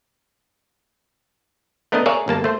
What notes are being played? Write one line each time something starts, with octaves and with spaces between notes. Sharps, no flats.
A3 B3 D4 A#4 D#5
G#4 A#4 C#5 D5 E5 F5
G1 A#3 A5
A3 C5